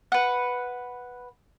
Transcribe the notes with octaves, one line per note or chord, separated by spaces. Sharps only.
B4 F#5